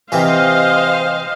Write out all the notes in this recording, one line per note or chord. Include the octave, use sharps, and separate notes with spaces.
C3 E3 C5 D#5 F5